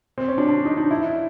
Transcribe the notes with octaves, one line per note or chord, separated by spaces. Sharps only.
C4
C#4
D4
D4
D#4
D4
E4